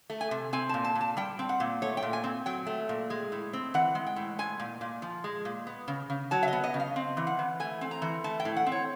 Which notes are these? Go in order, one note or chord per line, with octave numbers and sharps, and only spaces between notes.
A3
G#5
C3
C4 G#5
A#2 A5
A5
A#2
A5
G3 G5
C4
F#5
A#2
A3 C#5
G5
A#2
G#5
C4
F#3 G5
A3
A#2
G#3
A2
C4
E3 F#5
G#3
G5
A2
G#3 G#5
A#2
A#2
F3
G#3
A#2
B3
C#3
C#3
F#3 A5
E5
B3 D#5
D#5
C#3
F5
C4
E3
F#5
E3
A3 G#5
C4
A#5
E3
A3 A5
G5
A2
F#5
C4
C#5